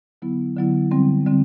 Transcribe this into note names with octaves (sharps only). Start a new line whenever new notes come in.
D3 F#3 B3 E4
D3 F#3 B3 E4
D3 G3 C4
D3 G3 C4